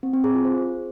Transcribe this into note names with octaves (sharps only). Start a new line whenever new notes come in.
C4
C4
G#4
F4
C5